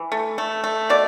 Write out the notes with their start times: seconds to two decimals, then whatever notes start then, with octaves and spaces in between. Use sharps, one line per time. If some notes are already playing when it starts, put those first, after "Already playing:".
Already playing: E3
0.12 A3
0.38 A3
0.64 A3
0.90 B2 D5